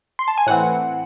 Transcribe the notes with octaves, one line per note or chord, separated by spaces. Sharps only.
C6
A5
G#5
A2 E3 C4 F#5